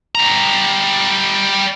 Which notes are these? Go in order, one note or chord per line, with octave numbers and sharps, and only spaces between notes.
G3 A#5